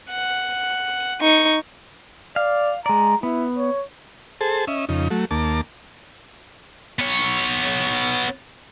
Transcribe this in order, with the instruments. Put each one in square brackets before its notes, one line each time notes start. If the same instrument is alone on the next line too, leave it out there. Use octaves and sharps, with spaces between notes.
[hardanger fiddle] F#5
D#4 C#6
[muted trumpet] D5 [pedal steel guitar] F5
[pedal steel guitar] G#3 D5 [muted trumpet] A#5
[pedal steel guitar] B3 [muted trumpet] E4
[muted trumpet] C#5
[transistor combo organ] G#4 A4 C5 A5
C#4 D#5 E5
F2 C#3 D#4
F#3 A3
D#2 A#3 A5 D6
[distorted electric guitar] B3 C#5